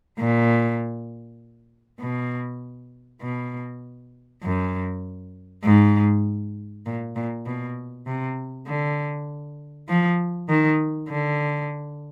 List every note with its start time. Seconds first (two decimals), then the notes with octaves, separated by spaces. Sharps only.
0.19 A#2
2.00 B2
3.22 B2
4.43 F#2
5.64 G#2
6.86 A#2
7.16 A#2
7.46 B2
8.06 C3
8.67 D3
9.88 F3
10.49 D#3
11.10 D3